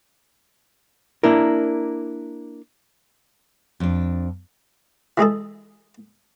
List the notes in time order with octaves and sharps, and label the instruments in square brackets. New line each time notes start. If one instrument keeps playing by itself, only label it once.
[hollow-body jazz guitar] A#3 D4 E4 A#4
[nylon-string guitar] F2 D4
[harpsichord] E3 G#3 G#4 A4